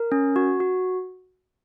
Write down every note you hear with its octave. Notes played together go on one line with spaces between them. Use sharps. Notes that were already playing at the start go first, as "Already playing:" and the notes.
Already playing: A#4
C#4
F#4
F#4